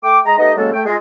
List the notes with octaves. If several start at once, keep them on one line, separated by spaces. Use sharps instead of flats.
A3 G5 D6
G#3 D#5 A#5
A3 B3 D#4 G4 D#5
C#3 F#3 G#3 A#3 A4
A3 G5
G#3 F4 G#4 D#5